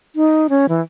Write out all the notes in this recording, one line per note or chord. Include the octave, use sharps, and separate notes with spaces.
D#4
C#4
E3